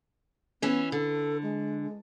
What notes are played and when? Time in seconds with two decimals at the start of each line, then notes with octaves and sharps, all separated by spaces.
0.62 E3 B3 C#4
0.92 D3 A4
1.43 G#3